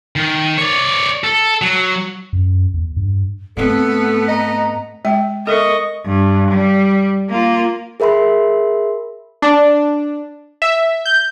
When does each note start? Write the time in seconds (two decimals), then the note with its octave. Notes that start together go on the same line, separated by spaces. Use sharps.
0.16 D#3
0.58 C#5 D5
1.24 A4
1.62 F#3
2.33 F#2
2.74 E2
2.97 G2
3.57 G#2 A3 B3 C4 A4
4.28 D#5 A#5
5.05 G#3 E5 G5
5.47 A4 A#4 D#5 E5 C#6
6.05 G2
6.51 G3
7.30 A#3 F4
8.00 G#4 A#4 E5 B5 C6
9.42 D4
10.62 E5
11.06 G6